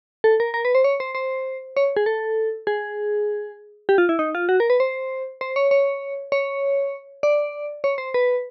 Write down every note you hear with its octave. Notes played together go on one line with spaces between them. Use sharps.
A4
A#4
A#4
B4
C5
C#5
C5
C5
C#5
G#4
A4
G#4
G4
F4
E4
D#4
F4
F#4
A#4
B4
C5
C5
C#5
C#5
C#5
D5
C#5
C5
B4